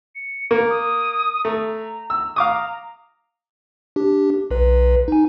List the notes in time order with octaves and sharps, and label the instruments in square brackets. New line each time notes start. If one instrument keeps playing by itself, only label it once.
[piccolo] C#7
[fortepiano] A#3
[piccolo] D#6
[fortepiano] A3 [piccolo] A#5
[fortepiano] E6
[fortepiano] F5 D6 D#6 [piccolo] A#5
[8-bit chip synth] D4 G4
B1 B4
D#4 G#5